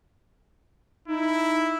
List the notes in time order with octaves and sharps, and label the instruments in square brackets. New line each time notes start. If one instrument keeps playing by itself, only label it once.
[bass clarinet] D#4 [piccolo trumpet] E4